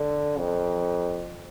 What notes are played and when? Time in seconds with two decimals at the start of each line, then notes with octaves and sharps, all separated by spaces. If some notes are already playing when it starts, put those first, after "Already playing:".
Already playing: D3
0.37 F2